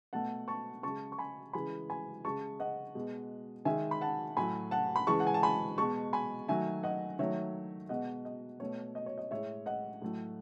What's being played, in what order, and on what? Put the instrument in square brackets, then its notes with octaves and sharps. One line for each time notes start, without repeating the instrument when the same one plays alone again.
[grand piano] B2 A3 F#5 A5
A5 C#6
C#3 G#3 A5 C#6
C#6
G#5 B5
C#3 E3 G#3 G#5 B5
G#5 B5
C#3 G#3 A5 C#6
D#5 F#5
B2 G#3
D#3 G#3 E5 G#5
B5
F#5 A5
A2 F#3 A3 G#5 B5
F#5 A5
B5
C#3 E3 G#3 A5 C#6
F#5
G#5
A5
G#5 B5
B2 G#3 A5 C#6
G#5 B5
D#3 F#3 A3 E5 G#5
D#5 F#5
D#3 F#3 A3 C#5 E5
B2 G#3 D#5 F#5
D#5
B2 A3 C#5
D#5
C#5
D#5
A2 G#3 C#5 E5
D#5 F#5
A2 F#3 A3